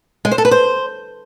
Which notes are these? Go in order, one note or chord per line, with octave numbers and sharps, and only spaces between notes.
G#3
C5
A4
B4
C5